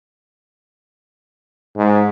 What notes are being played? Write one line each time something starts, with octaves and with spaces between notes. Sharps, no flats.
G#2